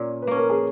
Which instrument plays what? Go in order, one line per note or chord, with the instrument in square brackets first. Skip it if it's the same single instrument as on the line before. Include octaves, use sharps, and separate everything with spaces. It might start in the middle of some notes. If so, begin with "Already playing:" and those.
Already playing: [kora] A#2 A#3 C#4
[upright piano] B4
[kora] A#3 C#4
[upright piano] A#4
G#4